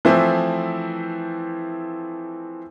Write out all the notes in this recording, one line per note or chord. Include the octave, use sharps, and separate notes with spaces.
E3 F3 A3 C4 E4